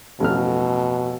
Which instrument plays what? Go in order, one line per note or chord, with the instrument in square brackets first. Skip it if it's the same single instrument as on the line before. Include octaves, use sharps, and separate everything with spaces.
[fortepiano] A1 F2 F6 [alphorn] B2